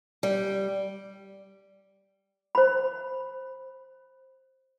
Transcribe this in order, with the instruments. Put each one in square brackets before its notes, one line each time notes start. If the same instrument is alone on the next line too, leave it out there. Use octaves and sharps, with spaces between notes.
[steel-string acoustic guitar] G3
[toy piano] C5 B5